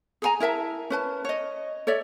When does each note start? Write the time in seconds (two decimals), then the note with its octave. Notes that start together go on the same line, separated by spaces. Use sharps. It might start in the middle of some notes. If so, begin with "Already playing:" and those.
0.22 G#4 A4 G#5 A#5
0.40 E4 A#4 E5 A5
0.90 C#4 B4 A5
1.25 C#5 D#5
1.87 A4 C#5 D5 E5